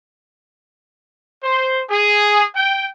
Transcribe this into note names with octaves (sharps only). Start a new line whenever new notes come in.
C5
G#4
G5